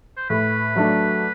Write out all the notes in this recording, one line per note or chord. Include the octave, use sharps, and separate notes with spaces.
C5
A2 B4
F#3 A3 D4